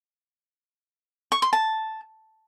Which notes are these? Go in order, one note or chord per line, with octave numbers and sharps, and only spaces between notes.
C#6
C6
A5